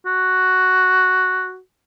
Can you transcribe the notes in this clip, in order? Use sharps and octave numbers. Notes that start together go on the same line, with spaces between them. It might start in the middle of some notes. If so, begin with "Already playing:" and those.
F#4